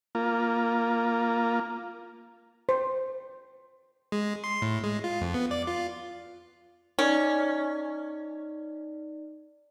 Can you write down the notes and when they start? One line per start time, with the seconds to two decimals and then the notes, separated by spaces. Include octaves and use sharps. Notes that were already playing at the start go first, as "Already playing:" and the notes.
0.15 A#3 F4
2.69 C5
4.12 G#3
4.44 C6
4.62 A2
4.84 G#3
5.04 F4
5.21 F2
5.34 B3
5.51 D5
5.67 F4
6.99 C#4 D#4 D5